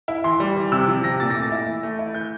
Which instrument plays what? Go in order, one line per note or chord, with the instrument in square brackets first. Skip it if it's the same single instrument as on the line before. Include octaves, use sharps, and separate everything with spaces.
[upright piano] E4
E3 C6
G3
E3
C3 E6
F3
C3 A#6
A#2 A6
A3 A#6
A6
E4
E3
A3
E4
E3 G6